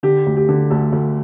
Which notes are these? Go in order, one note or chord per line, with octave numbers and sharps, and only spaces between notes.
D3 G4
D2
G4
D3
D2 A4
D2